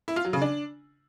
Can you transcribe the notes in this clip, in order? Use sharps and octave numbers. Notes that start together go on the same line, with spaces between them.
E4
F4
F#3
C#3
D4